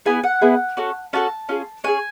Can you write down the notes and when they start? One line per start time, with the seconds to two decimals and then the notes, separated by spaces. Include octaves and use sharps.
0.05 B3 E4 G#4 G#5
0.24 F#5
0.41 B3 E4 G#4
0.77 C#4 F#4 A4
1.13 C#4 F#4 A4 A5
1.49 C#4 F4 G#4
1.84 C#4 F4 G#4 G#5